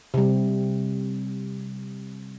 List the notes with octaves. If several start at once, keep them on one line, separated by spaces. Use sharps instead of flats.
C3 G3